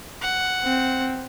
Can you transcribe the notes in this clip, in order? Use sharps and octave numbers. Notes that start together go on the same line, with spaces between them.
F#5
C4